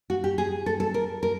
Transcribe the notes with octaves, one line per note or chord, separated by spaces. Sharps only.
F#4
G4
G#4
A4
A4
A#4
A#4